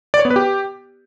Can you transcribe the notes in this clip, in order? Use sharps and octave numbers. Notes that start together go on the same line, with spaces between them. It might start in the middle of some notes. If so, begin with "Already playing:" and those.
D5
C#5
B3
B4
G4